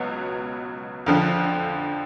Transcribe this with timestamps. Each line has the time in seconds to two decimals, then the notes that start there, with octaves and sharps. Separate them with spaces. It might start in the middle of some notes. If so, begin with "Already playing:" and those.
Already playing: C#2 B2 F#3 B3
1.06 F2 D3 F3